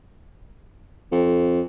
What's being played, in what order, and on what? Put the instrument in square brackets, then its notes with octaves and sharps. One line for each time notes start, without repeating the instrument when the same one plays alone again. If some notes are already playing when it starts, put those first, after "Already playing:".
[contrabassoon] F2